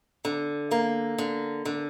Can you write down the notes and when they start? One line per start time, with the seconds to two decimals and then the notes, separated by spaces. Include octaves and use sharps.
0.25 D3
0.71 A#3
1.18 D3
1.65 D3